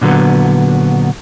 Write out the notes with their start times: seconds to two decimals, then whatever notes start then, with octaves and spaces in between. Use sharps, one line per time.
0.01 A#2 D3 F#3 B3